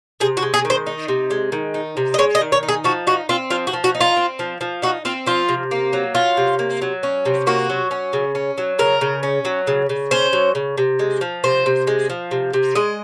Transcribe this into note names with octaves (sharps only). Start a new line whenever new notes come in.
C3 G#4
F#4
G#3
G#4
D#3
C5
D#4
C3
G#3
D#3
D#4
C3
D#5
G#3 C#5
D#5
D#3
C#5
D#4
G#4
F3 F#4
D#4 F#4
C4 F4
F3 F4
F#4
F3
F#4
D#4
F4
C4
F3
F3
D#4 F#4
C4 F4
F3 F4
C3
A#3
F#3
C#4 F4
C3
A#3
F#3
C#4
C3
A#3 F#4
F#3
C#4
C#3
C#4
F#3
C#3 A#4
C#3
C#4
F#3
C#3
C#3
C#4 C5
F#3
C#3
C3
G#3
F3
C3 C5
C3
G#3
F3
C3
C3
G#3 D#5